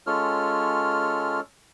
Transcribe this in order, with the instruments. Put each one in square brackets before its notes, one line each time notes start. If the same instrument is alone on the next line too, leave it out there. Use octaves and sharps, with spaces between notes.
[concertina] G#3 C#4 F4 A4 C#5 F6